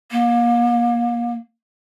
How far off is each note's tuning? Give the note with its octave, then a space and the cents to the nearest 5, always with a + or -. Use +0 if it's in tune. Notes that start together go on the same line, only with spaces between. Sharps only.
A#3 +30